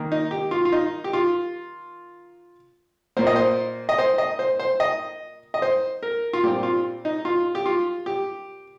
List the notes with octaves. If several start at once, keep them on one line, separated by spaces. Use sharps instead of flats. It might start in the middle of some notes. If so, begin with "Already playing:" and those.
Already playing: D#3 A#3
D#4
G4
F4
F4
D#4
G4
F4
A#2 A#3 C5
D#5
C5
D#5
C5
D#5
C5
C5
D#5
D#5
C5
A#4
F4
A#2 G3 C4 G4
F4
D#4
F4
G4
F4
G4